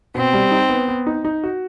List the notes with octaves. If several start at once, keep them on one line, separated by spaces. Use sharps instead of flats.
B2 C4
G3
D#4
B3
B3
D#4
D#4
F#4